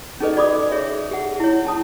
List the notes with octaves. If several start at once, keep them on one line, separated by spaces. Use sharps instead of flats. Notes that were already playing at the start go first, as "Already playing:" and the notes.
C#4 D#4 G#4 A4 B4 D#5
F#4 D5 B5 D6 D#6
G#4 C#5 E5
G4 G#4 F#5
E4 C#5
C#4 A5 D#6